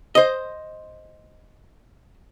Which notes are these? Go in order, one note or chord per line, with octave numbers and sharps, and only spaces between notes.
C5 D#5